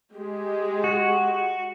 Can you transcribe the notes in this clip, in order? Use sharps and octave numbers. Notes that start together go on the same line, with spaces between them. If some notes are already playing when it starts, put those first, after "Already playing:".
G#3 G4
F#4